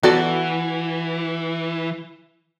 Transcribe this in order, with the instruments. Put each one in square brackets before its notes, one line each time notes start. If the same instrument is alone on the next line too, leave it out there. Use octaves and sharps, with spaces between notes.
[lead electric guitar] E3 [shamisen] B3 A4 D5 [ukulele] F#4